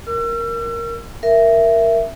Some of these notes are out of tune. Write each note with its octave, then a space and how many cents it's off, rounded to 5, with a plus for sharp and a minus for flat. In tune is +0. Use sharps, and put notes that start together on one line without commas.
A#4 +0 E6 +40
A#4 +0 E5 +15